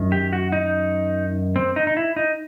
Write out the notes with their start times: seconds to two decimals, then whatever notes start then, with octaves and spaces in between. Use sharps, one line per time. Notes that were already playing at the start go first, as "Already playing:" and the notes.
Already playing: F#2 D#3
0.12 G4
0.33 F#4
0.52 D#4
1.56 C4
1.76 D#4
1.87 D#4
1.97 E4
2.16 D#4